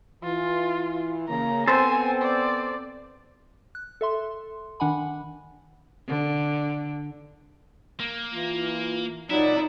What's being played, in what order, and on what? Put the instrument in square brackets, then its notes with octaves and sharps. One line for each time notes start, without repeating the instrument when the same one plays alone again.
[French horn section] E3 [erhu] F4
[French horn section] C#3 A#3 [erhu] A#5
[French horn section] B3 C4 [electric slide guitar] A4 C5 [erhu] G#5
[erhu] D5
[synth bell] F#6
A4 E5 C6
D#3 D4 F#5 G#5 B5
[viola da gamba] D3
[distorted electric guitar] A#3
[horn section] E3 F4
[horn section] A#2 F#3 [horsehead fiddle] D#4 [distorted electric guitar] E4 [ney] D5